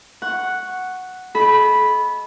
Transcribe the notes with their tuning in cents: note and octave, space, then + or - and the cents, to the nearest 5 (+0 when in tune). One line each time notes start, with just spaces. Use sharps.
F#5 +0 C#6 +0
A4 -40 D#5 +0 B5 -5